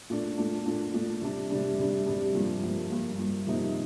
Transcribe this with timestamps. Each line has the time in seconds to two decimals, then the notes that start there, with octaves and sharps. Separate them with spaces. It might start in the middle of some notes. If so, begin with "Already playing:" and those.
0.10 A#2 A3 D4
0.38 A#2 A3 D4
0.66 A#2 A3 D4
0.94 A#2 A3 D4
1.22 C3 G3 D4
1.50 C3 G3 D4
1.78 C3 G3 D4
2.06 C3 G3 D4
2.34 G2 F3 A#3
2.63 G2 F3 A#3
2.90 G2 F3 A#3
3.18 G2 F3 A#3
3.47 C3 F3 A#3 D#4